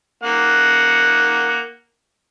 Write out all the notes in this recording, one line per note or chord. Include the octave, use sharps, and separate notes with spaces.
A#3 F#5